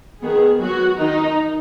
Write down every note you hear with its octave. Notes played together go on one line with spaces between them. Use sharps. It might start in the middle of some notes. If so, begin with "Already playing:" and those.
D#3 B3 G#4
F#3 B3 F#4
D#3 D#4